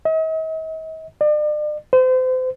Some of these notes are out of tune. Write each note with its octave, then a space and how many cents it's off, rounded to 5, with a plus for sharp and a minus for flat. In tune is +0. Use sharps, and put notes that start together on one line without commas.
D#5 +45
D5 +40
C5 -35